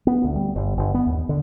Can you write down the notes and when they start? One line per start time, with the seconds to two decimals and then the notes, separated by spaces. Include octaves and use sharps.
0.07 B3
0.24 D2
0.36 G3
0.56 G1
0.78 G1
0.94 B3
1.06 D#2
1.29 D3